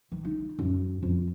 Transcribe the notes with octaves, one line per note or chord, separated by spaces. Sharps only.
D#3
D#4
F#2
F2